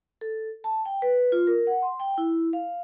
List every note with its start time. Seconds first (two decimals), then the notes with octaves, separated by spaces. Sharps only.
0.21 A4
0.64 A5
0.85 G5
1.02 B4
1.32 F4
1.47 A#4
1.67 F#5
1.82 C6
2.00 G5
2.18 E4
2.53 F5